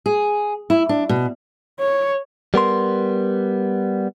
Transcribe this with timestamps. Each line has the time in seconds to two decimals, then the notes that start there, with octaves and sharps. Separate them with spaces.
0.06 G#4
0.70 E4
0.89 D4
1.09 B2
1.80 C#5
2.54 G3 B3 A#4 C6